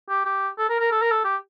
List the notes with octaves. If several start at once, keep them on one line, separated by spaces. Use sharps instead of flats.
G4
G4
A4
A#4
A#4
A4
A#4
A4
G4